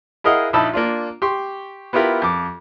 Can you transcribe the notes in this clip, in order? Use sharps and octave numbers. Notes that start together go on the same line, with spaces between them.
E4 G#4 A#4 D#5 F5 F#5
A#1 D#4 E4 A5 B5 E6
A#3 D4 F4
G4 C6 C#6
B3 E4 F4 G4 A#4
F2 D6